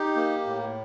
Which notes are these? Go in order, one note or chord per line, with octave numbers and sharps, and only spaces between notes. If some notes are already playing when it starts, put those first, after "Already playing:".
Already playing: D#4 G4
A#3
A2